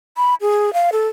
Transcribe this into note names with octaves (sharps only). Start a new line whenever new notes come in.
B5
G#4
F5
A4